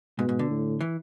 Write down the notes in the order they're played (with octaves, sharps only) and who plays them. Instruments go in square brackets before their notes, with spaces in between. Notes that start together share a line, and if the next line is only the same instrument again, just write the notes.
[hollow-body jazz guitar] G#2 [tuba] B2
[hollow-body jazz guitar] G#2
D3
[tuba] A2
[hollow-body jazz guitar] E3